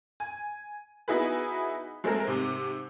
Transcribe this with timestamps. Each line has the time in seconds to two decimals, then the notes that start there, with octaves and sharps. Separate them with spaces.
0.20 G#5
1.08 B3 D#4 E4 F#4 G#4 B4
2.04 G#3 A3 C4 G#4 A#4
2.27 G#2 C3